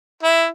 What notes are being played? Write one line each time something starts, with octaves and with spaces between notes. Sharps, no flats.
E4